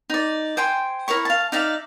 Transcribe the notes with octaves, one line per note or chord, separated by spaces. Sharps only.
D#4 D5
C5 G5 G#5 C6
E4 A#4 C#5 C#6
F5 A5
D#4 D5 E5 F5